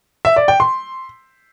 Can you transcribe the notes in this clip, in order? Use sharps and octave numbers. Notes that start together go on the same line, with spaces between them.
E5
D5
G5
C6